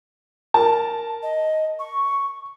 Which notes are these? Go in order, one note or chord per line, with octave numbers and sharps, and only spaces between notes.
A#4 A5
D#5
C#6